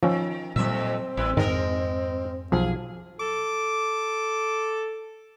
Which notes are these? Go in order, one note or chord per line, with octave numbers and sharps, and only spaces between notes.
D#3 F3 C#4
F2 A#2 F#3 G3 C4 E5
A1 G3 E4 B4
F2 G#2 D#3 G#3 A#4 D#5
B1 F3 G#4 F5
A4 D6